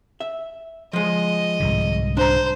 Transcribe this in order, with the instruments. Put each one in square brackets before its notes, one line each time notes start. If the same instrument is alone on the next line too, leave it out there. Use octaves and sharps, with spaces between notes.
[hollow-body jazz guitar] E5
[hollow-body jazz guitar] F3 G#3 [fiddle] D#5
[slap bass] C2 G#2 D3
[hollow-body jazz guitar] D4 A#5 [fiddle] C5